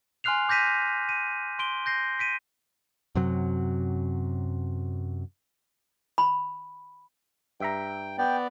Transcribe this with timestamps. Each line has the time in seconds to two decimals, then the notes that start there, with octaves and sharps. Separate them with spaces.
0.24 G#5 C6 F6 F#6 C7 F7
0.49 D6 G6 A#6 B6 D#7
1.09 D#7
1.59 C6 D7 G7
1.86 G6 A#6 C7
2.19 B6 D7 D#7
3.15 F#2 C3 F#3
6.18 B5
7.60 G2 E5 G5 A#5
8.18 B3 D5 G5